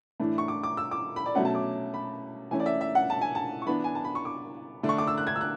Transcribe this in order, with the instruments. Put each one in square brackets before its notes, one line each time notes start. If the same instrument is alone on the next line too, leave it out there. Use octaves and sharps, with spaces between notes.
[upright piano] A2 E3 A3 D4
C#6
D6
D6
E6
D6
B5
D5
B2 F#3 A3 C#4 F#5
A5
D6
B5
E3 A3 C#4 G#5
D5
E5
E5
F#5
A5
G#5
A5
C#6
E3 B3 D4 B5
G#5
A5
B5
C#6
D6
D3 A3 D4
C#6
D6
E6
F#6
G#6
E6
F#6